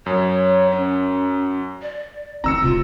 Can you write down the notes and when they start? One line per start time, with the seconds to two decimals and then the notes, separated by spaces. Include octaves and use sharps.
0.06 F#2 C#5
0.71 C#4
1.82 D5
2.44 D#3 C4 A#5 E6 C#7
2.62 D1 C3 F4